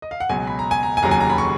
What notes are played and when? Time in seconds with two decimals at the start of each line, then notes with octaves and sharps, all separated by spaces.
0.02 D#5
0.11 F5
0.20 F#5
0.29 C#2 B2 F#3 G#5
0.47 B5
0.59 A#5
0.71 G#5
0.83 A#5
0.97 G#5
1.03 F1 D#2 C#3 F#3 A#5
1.11 G#5
1.20 A#5
1.30 B5
1.38 C#6